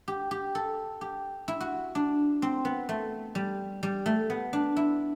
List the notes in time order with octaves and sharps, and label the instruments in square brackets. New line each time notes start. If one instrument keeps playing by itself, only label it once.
[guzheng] G4
G4
A4
G4
E4
F#4
D4
C4
B3
A3
G3
G3
A3
B3
D4
E4